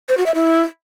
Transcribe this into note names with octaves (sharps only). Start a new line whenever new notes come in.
C5
F#4
E5
E4